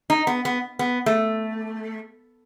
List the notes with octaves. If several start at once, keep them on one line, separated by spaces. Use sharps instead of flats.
D#4
B3
B3
B3
A3